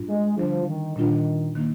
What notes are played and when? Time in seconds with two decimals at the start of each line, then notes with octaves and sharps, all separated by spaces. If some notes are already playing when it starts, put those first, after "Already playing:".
Already playing: G#2 G3 D4 F4
0.09 G#3
0.37 D3 F3 G3 D4
0.67 D#3
0.96 A#2 D#3 G3 D4 F4
1.55 D#3 A#3 D#4